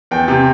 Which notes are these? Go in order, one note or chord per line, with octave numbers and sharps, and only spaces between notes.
E2 G5
C3